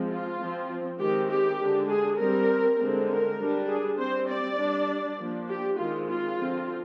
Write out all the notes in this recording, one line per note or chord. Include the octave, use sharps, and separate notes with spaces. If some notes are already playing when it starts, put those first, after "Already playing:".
Already playing: F3 G#3 C4
F4
F3 C4
D#3 G#3 C4 G4
G4
D3 G#3 D4
G#4
G3 C4 A#4
D3 G#3 C4
A#4
G3 D4
G#4
G3 C4 C5
D5
G3 D4
F3 A#3 D4
G4
D#3 G#3 C4 F4
F4
D3 F3 C4